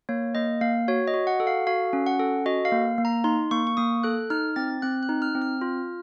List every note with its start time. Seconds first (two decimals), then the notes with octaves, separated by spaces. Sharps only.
0.09 A#3 C#5
0.35 A#3 D#5
0.61 A#3 F5
0.88 F#4 C#5
1.08 D#5
1.14 F#4
1.27 F#5
1.40 A4
1.47 F5
1.67 F#4 F5
1.93 C#4
2.06 F#5
2.20 A4
2.46 F#4 D#5
2.65 F5
2.72 A#3
2.98 A#3
3.05 A#5
3.24 D#4 C6
3.51 A#3 C#6
3.67 C#6
3.77 A#3 D#6
4.03 A4 F#6
4.30 D#4 F6
4.56 C4 A6
4.82 C4 F#6
5.03 F#6
5.09 D#4
5.22 F6
5.35 C4
5.42 F6
5.61 F4